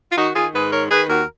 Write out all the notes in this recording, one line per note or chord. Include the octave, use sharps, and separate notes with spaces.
F4
D#3 D#4 F#4
D#3 F4 G#4
G#2 G#4 B4
D#3 A#4 C#5
D#3 G#4 B4
D#2 F#4 A#4